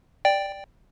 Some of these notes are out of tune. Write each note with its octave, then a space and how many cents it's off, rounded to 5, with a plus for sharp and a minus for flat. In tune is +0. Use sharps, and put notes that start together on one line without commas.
D5 +0 G5 +5